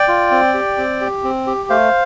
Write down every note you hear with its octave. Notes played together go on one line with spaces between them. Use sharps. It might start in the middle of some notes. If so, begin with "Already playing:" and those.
Already playing: D5 G5
F4
C4
G4
C4
G4
C4
G4
A3 C5 F5